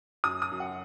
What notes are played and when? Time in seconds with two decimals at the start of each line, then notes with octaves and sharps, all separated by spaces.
0.24 F#2 D#6
0.42 D#6
0.51 F#2
0.60 F#5